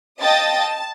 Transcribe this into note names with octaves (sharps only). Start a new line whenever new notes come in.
D#5 F5 G5 A5 D#6 A6
A5